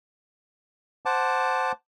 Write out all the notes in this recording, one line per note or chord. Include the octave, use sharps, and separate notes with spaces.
C5 F#5 A5 D6